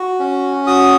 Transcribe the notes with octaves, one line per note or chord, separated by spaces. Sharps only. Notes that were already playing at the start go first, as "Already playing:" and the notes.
Already playing: F#4
C#4
F#4 D#6